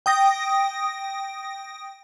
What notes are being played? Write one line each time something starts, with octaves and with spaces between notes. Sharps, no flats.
G5 D#6 A#6